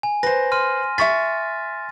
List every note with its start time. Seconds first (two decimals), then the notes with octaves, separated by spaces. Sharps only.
0.03 G#5
0.23 B4 C5 A#6
0.52 C6 F6 D#7
0.98 E5 C#6 A6 B6